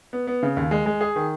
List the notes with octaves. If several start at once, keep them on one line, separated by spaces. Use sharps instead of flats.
B3
B3
C#3
D#2
G#3
G#3
G#4
D#3